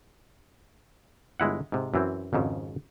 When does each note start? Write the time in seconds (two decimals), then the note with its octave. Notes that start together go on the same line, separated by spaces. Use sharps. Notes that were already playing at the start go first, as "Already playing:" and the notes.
1.40 G1 G#3 E4 F#5
1.72 G#2 C3
1.94 F#2 E3 C4
2.33 G#1 F2 G#2 C#3